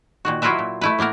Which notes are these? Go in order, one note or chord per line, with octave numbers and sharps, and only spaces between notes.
A#2 D#3 F#4
F#3 E4 F4 A#4 B4 E5
A#2
A3 E4 B4
A2 A#3 B3 A#4